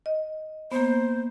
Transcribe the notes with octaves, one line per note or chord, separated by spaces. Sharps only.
D#5
A#3 B3 C5